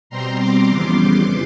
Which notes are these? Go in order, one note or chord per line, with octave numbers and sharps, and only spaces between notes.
B2 G3 C4 A#5 C6
C6 D6
F2 C#3 E3 G3 B3
C6 D6